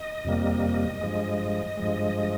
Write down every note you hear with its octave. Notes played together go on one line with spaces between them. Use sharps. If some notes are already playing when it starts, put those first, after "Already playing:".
Already playing: D#5
F2 C3 G3 A#3
G2 F3 G#3
G2 F3 G#3